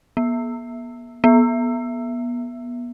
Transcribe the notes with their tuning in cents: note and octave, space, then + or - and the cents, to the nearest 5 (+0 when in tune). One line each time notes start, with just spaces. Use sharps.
B3 -40
B3 -25